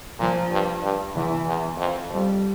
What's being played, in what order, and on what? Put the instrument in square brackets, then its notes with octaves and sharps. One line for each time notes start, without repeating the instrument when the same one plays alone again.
[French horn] A#2 [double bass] F3
[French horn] G2
G2
[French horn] E2 [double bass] E3
[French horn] E2
F2
[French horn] F2 [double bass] G3